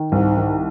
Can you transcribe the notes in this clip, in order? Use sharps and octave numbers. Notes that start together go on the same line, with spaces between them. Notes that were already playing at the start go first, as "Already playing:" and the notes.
Already playing: D#3
C2 G#2
D#3